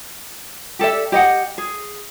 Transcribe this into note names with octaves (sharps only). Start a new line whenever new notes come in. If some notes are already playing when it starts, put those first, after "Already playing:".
G4 A4 D5 E5
G4 D#5 F#5
G#4